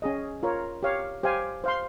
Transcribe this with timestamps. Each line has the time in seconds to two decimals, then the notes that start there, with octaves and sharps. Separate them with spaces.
0.02 C#4 G#4 D#5
0.43 F4 A#4 C#5
0.83 G4 C#5 F5
1.23 G4 C5 F5 G#5
1.64 C5 F5 C6